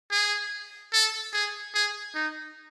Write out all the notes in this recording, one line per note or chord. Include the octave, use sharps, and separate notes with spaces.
G#4
A4
G#4
G#4
D#4